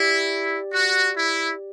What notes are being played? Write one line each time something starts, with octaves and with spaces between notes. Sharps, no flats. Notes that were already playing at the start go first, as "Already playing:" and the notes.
Already playing: E4 G4 D5
F#4
E4